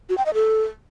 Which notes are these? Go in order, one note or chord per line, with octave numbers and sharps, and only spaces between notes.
F#4
G5
D#5
A4